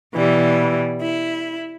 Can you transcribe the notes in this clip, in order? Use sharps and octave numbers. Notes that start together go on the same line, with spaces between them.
B2 E3 G3
E4